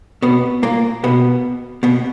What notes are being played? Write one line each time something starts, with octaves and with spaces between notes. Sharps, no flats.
B2 B3
A#2 A#3
B2 B3
B2 B3